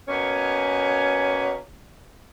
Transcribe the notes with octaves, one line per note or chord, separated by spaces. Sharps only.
B2 A#3 C#4